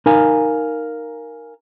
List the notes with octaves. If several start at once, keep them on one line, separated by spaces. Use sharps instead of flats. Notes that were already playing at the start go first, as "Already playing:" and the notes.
D#4 A#4 F5 G#5